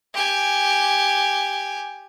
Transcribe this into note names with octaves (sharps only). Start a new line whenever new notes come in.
G4 G#5